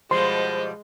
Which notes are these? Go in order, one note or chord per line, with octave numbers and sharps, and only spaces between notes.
B2 F3 G3 G#3 C5 C6